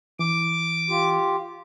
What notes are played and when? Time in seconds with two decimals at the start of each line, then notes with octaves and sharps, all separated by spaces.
0.19 E3 D6
0.89 F4 G4